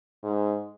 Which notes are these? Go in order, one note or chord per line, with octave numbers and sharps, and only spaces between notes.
G#2